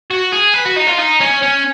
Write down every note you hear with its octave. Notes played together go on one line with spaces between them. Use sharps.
F#4
G#4
B4
F#4
D#4
F4
D#4
C#4
C#4